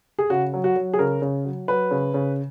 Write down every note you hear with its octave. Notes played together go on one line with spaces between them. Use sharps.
G#4
C#3 F#4
F#3
F#4
F#3
G#4
C#3 A#4
C#3
F#3
F#3 B4
C#3
C#3